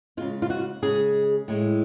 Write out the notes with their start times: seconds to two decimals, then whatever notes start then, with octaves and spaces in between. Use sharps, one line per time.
0.17 C#3 G#3 F4
0.42 F4
0.50 F#4
0.82 C#3 G#3 G#4
1.48 A2 G#3